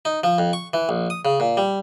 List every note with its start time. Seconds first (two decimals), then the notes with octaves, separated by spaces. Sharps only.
0.05 D#4
0.24 F3
0.38 F2
0.53 C#6
0.74 E3
0.89 A#1
1.10 D#6
1.25 C#3
1.40 A#2
1.57 G3